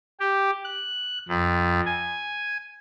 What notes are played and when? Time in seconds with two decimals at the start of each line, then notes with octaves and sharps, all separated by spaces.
0.20 G4
0.64 F#6
1.29 F2
1.86 G#5